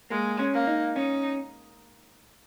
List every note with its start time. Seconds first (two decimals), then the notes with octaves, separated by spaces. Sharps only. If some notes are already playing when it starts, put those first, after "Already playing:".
0.10 G#3 A#3
0.39 C#4
0.53 A#3
0.67 D#4
0.96 C#4 D#4